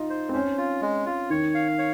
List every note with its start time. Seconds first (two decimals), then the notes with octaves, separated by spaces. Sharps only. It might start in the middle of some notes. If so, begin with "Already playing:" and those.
Already playing: D#4 F4
0.10 C5
0.29 C4
0.34 C#4 C5
0.57 F4
0.82 G#3
1.06 F4
1.30 D#3 C#5
1.55 F5
1.78 C#5